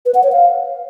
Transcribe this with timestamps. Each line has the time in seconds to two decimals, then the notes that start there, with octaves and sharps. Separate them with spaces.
0.06 B4
0.15 F#5
0.23 C#5
0.32 F5